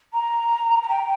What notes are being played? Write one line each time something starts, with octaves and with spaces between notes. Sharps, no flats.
A#5
A#5
G5